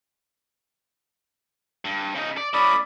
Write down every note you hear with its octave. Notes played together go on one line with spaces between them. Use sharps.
G2
C#3 D#4
D5
A2 C#4 D5 B5 D#6